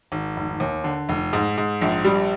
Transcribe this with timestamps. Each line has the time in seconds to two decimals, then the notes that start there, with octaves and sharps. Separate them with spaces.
0.12 G#1
0.36 F1
0.60 D#2
0.84 D3
1.09 F1
1.33 G#2
1.57 G#2
1.82 A#1
2.04 G3